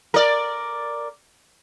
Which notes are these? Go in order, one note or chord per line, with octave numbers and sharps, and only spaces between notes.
A#4 D5